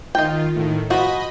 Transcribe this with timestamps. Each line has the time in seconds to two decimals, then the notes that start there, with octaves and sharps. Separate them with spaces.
0.15 D#3 F4 D#5 G5
0.55 A2 D#3
0.90 F3 F#4 D#5 B5